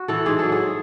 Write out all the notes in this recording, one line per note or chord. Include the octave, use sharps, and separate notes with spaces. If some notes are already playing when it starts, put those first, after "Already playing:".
Already playing: F#4
E3 A4
G#2 G#4
F#3 A4
G#4